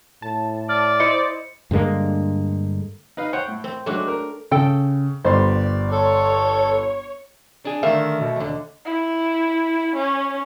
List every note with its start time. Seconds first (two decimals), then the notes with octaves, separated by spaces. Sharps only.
0.22 A2 A5
0.69 D5 F6
1.00 E4 C5 D#5 C#7
1.71 G2 D3 G#3 A#3
3.17 D#4 B4 F5
3.33 C5 C#5 F#5 G5
3.48 A2
3.64 C4
3.86 F#3 G#3 A3 D4 F#4
4.08 A#4
4.51 C#3 A4 G5
5.25 G1 G3 C5 D5 C6
5.91 A4 C#5
7.65 D4 G#4
7.83 D3 D#3 A3 E5 F5
8.20 B2
8.36 D#2 D3
8.86 E4
9.96 C#4